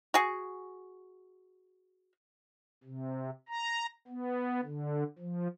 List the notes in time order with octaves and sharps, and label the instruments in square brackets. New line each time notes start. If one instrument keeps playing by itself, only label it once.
[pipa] F#4 G#4
[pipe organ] C3
A#5
B3
D3
F3